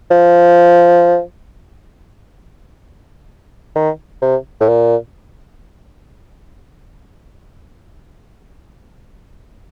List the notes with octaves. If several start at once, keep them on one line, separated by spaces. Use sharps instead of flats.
F3
D#3
C3
A2
A#2